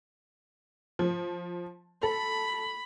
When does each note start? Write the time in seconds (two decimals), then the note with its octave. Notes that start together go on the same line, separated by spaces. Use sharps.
0.99 F3
2.03 A4 B5